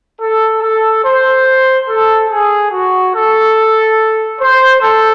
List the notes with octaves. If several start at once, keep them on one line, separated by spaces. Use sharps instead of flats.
A4
A4
C5
A4
G#4
F#4
A4
C5
A4